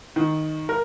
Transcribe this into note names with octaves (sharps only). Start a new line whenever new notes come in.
D#3
A#4